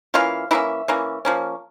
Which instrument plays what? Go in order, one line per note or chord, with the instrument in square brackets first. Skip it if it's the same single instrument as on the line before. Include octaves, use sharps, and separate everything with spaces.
[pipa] E3 A#3 C#4 F4 F5
E3 A#3 C#4 E4 E5
E3 A#3 C#4
F3 A#3 C#4